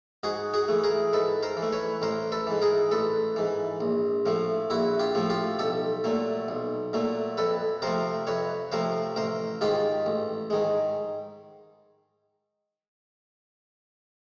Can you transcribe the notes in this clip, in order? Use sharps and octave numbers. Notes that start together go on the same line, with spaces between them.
G#2 F#4 G#4
F#4 G#4
E3 A3
G#4 A#4
G#2 A4 B4
A#4 C5
E3
A3
B4 C#5
A1 A#4 C5
A4 B4
G#2 E3
G#4 A#4
A1 A4 B4
G#2 E3
A#1
A2 F3 A3
A#1 E4 F#4
F4 G4
A2 F3 A3
F4 G4
B1 G4 A4
A#2 F#3 A3
B1
A#2 F#3 A3
F2 A4 B4
C3 F3 A3 A#4 C5
F2 B4 C#5
C3 F3 A3 A#4 C5
A1 A#4 C5
G#2 D#3 G#3 F4 G4
A1
G#2 D#3 G#3